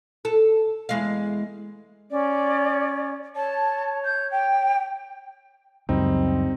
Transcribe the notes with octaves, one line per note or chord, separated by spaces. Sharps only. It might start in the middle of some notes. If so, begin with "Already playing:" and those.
A4
E2 G#3 F5
C#4 D5
C#5 A5
G6
G5
C#2 F#2 G3 C4 D#4